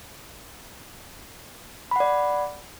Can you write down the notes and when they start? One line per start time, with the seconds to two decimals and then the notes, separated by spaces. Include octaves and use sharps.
1.91 B5
1.96 F#5
2.00 D5